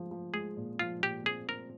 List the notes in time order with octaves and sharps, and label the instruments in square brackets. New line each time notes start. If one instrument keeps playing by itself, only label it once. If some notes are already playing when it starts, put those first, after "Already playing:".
Already playing: [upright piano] F3 G#3
F3
[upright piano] G#3 [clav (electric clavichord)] G#4
[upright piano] A#2
[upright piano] F3 [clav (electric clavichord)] F4
[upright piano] A#2 [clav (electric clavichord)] G4
[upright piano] C4 [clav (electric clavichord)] G#4
[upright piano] C4 [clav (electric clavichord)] A#4